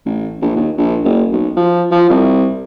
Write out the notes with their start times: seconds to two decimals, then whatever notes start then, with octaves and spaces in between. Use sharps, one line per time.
0.06 A1
0.42 A#1
0.56 D#2
0.78 A#1
1.04 F#1
1.32 B1
1.57 F3
1.91 F3
2.10 C2